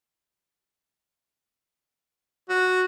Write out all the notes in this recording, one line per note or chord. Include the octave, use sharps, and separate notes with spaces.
F#4